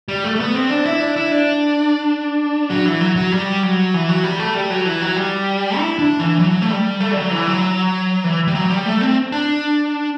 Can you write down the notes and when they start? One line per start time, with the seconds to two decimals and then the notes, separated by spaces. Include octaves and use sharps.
0.08 G3
0.24 A3
0.36 A3
0.40 B3
0.55 C4
0.70 D4
0.86 E4
1.00 D4
1.16 E4
1.32 D4
2.70 F#3
2.86 E3
3.01 F#3
3.16 F#3
3.32 G3
3.63 F#3
3.94 E3
4.09 F#3
4.24 G3
4.39 A3
4.55 G3
4.70 F#3
4.85 E3
5.02 F#3
5.16 G3
5.78 E4
5.99 D4
6.20 E3
6.39 F#3
6.62 A3
6.71 G3
7.00 A3
7.11 G3
7.16 F#3
7.32 E3
7.47 F#3
8.24 E3
8.47 G3
8.55 F#3
8.70 G3
8.86 A3
9.01 C4
9.32 D4